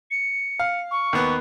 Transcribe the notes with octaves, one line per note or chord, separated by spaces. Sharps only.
C#7
F5
C#6
D#2 B3 F#6